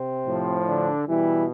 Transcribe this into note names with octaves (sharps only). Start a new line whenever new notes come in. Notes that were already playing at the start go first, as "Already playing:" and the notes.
Already playing: C3 C4
A2 F3
D3 D4
B2 E3 G3 E4